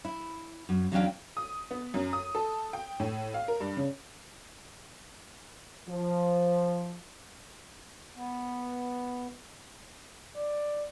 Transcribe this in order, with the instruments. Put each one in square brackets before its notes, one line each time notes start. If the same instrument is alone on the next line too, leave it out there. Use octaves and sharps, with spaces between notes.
[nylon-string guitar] E4
F#2
E2 F#3 C#4 D4 F5 G5
[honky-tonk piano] D#6
B3
F#2
D#6
A4
G5
A2
F5
A#4
G2
C#3
[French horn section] F3
[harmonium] B3
[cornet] D5